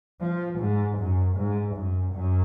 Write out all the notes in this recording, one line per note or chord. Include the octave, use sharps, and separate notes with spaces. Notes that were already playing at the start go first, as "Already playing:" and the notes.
F3
G#2
F#2
G#2
F#2
F#2